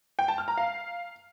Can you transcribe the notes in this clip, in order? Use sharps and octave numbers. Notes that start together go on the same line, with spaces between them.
G5
A5
F6
A#5
F5